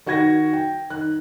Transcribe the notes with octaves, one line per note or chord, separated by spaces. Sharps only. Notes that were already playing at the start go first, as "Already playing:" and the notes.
D#3 F#4 F#5 G#6 A#6
G5
D#3 F#6